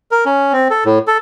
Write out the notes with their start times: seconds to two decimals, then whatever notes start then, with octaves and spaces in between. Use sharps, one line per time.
0.11 A#4
0.26 C#4
0.53 C4
0.70 A4
0.85 A2
1.07 A4